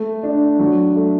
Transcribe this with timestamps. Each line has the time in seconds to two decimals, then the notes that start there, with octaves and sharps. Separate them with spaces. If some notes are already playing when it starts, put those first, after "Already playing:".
Already playing: A3
0.23 D4
0.59 F#3
0.95 A3